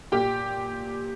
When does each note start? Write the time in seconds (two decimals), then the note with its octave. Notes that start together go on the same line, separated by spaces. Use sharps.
0.12 A#2 G4 G5